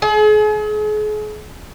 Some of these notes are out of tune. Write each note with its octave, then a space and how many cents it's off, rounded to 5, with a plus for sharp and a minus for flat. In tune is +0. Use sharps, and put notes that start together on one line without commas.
G#4 +40